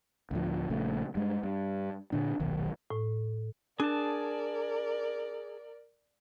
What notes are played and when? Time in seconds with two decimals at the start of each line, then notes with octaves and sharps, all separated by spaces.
0.31 D2 A2 F3
0.70 A#1 C#3 A3
1.15 G2 G#3
1.43 G2
2.12 A#2 D3 D4
2.40 D#1 B1 D#3
2.90 A2
3.80 D4 G#4 A#4 D5 A5